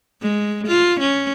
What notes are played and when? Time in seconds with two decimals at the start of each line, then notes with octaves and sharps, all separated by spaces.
0.22 G#3
0.67 F4
1.00 C#4